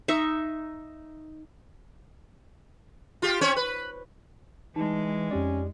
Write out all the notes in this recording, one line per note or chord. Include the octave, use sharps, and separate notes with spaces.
D#4 E5 C#6
F4 G4
C4 C#4 C#5
B4
E3 G#3 D#4
F2 C#4 G4 D5